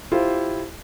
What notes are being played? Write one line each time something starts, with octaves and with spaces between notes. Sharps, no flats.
E4 F4 G4 C5